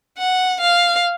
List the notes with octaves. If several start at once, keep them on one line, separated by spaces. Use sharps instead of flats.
F#5
F5